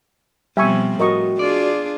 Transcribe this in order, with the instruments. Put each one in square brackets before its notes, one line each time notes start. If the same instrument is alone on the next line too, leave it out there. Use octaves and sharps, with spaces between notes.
[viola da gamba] B2 F3 C4 [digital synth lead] G3 [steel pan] E5 G#5 C#6
[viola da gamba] A2 [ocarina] F#4 [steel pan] A#4 D#5 C#6
[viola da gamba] D4 F4 G#4 [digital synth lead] D5